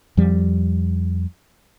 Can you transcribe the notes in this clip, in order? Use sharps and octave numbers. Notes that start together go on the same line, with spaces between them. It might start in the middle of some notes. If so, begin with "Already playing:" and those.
F2 F3 G3